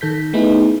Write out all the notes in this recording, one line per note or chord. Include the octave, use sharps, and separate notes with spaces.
D#3 A4 G6 B6
A3 B3 D#4 E4 G#4 B4